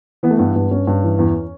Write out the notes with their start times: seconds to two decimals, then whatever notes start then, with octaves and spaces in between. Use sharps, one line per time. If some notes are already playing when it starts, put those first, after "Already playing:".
0.23 E3 B3
0.31 A3
0.38 G2 B3
0.56 G2
0.71 G2 C#4
0.87 G2
1.03 E3
1.19 E2